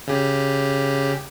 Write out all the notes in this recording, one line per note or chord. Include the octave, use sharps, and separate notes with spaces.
C#3 G4